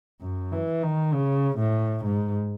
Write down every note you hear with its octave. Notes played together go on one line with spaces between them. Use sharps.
F#2
E3
D#3
C#3
A2
G#2